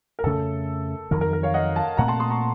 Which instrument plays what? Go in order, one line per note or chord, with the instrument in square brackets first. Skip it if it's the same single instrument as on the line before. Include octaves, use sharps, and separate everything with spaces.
[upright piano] A#4
[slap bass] F2 C#3 A3 [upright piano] A4
[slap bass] F2 D#3 F#3 [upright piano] A#4
[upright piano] A#4
A#4
C#5 F5
D#5 F#5
F5 A5
[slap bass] A#2 A3 C4 [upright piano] F#5 A#5
[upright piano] A5 C6
C6 D#6
A#5 C#6